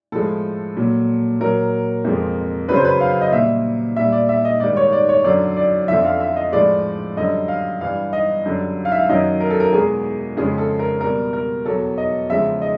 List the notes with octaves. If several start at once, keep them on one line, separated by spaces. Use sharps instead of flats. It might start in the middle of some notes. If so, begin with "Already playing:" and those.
A2 F3 G#3 A4
A#2 F#3
A#2 F#3 A#4
F2 C3 F3 G#3
F#2 C#3 F#3 B4
C5
B4
F5
D#5
A#2 G3 E5
A#2 G3 E5
D5
E5
D#5
G#2 D#3 G3 D5
C#5
D5
C#5
F#2 D3 F#3 D5
D5
F2 D3 F3 E5
F5
E5
D#5
A2 F3 G#3 D5
F#2 D3 G3 D#5
F5
G2 E3 G3 F5
D#5
F#2 D3 G3
F5
E5
F5
F#2 D#3 F#3 D#5
A#4
A4
A#4
E2 B2 G#3 G#4
F2 C#3 F3 G#3 G#4
A4
A#4
B2 G3 A#4
A#4
E2 B2 F#3 A4
D#5
E2 C#3 F3 G#3 E5
D#5